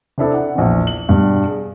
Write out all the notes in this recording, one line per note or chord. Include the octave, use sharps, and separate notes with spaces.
C3 D4 E4 A4
F#5
A#1 E2
F#7
G2 B2 G3
G#4